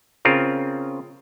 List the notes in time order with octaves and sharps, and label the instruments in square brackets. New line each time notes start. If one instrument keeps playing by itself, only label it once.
[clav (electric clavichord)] C#3 C4 F4 A#4